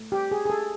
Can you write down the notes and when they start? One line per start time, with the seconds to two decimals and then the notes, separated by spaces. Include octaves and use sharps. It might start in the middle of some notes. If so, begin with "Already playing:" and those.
Already playing: A3
0.12 G4
0.31 G#4
0.45 G#4
0.50 A4